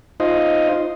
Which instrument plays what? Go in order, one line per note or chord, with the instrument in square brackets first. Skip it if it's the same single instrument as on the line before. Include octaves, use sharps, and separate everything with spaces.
[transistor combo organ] D#4 F4 C5 D#5